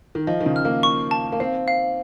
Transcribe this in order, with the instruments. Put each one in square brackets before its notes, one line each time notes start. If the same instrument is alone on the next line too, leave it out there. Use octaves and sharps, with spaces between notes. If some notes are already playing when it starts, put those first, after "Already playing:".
[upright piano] D#3
[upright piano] F3 [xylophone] D#5
[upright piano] D#3
C#3
[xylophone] F6
[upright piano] A#3
[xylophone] C#6
A5
[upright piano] A#3
[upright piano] C4 [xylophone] F5
[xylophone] F5